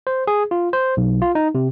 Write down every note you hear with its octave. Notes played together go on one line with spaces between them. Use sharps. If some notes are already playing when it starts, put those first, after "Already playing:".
C5
G#4
F4
C5
B1
F4
D#4
C3